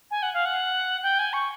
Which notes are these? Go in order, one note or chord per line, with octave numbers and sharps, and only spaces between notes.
G#5
F#5
F5
F#5
G5
G#5
C#6